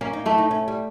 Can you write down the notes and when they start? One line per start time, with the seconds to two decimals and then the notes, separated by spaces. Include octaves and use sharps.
0.01 A#3 C#4
0.13 D#4
0.26 A3 E4
0.38 D#4
0.51 C#4
0.68 G3